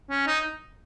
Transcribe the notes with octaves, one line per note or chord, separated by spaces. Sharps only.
C#4
D#4